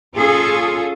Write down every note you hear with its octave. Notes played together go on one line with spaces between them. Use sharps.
C#4 F4 G#4 A4